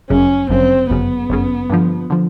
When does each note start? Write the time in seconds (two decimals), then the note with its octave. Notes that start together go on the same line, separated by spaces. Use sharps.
0.10 G1 F#2 C#3 C#4
0.49 G1 F#2 C#3 C4
0.90 G1 F#2 C#3 B3
1.30 G1 F#2 C#3
1.70 G2 D3 F3
2.10 D3 F3